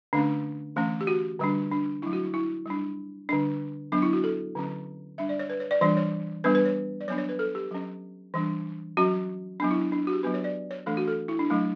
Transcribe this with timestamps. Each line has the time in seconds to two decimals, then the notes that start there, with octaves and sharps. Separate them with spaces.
0.13 D3 A3 C#4 D4
0.76 E3 A3 C#4
1.01 G4
1.07 F#4
1.39 D3 G3 D4
1.71 D4
2.02 F#3 A3 D4 E4
2.13 F#4
2.23 E4
2.34 E4
2.66 G3 D4
3.29 D3 G3 D4
3.92 F#3 B3 D4
4.02 E4
4.13 F#4
4.24 A4
4.55 D3 F#3 C#4
5.18 G3 D4 E5
5.29 D5
5.39 C#5
5.50 B4
5.60 C#5
5.71 D5
5.81 E3 G3 D4 D5
5.97 C#5
6.44 G3 B3 D4 B4
6.55 B4
6.65 C#5
7.01 D5
7.08 F#3 B3 D4 C#5
7.18 C#5
7.29 B4
7.39 A4
7.55 G4
7.71 F#3 C#4
8.34 E3 G3 D4
8.97 F#3 C#4 F#4
9.60 F#3 B3 D4
9.71 E4
9.81 D4
9.92 D4
10.07 F#4
10.13 G4
10.23 F#3 B3 D4 B4
10.34 C#5
10.44 D5
10.71 C#5
10.86 E3 A3 D4 A4
10.97 F#4
11.08 A4
11.28 E4
11.39 D4
11.50 F#3 A3 D4